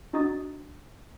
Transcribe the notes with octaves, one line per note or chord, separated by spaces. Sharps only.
D4 D#4 F#4 D#5 D#6 A6